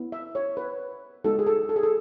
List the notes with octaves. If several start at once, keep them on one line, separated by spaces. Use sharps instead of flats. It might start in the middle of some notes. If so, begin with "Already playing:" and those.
Already playing: B3 E4
E5
C#5
B4
G#3 B3 D#4 F#4 A4
G#4
A4
A4
G#4
A4